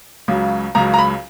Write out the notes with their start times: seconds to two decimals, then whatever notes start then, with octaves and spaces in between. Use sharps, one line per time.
0.28 C#2 C#3 F#3
0.75 C#2 C#3 F#3 A#5
0.94 A#5
0.99 B5